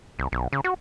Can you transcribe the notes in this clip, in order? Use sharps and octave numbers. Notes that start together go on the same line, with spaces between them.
C2
B1
C#3
F#4